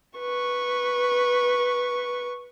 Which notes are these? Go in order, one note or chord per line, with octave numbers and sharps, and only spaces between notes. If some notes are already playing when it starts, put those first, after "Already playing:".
B4 C#6